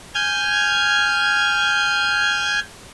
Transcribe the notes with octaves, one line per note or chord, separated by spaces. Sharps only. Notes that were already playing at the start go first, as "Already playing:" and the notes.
G#5 F6 G6 G#6